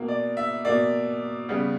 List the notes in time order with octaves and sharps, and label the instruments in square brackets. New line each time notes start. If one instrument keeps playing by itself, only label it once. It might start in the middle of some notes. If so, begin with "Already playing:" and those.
Already playing: [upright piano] B2 A#3
D5
E5
B2 A#3 D5
C#3 G3 B3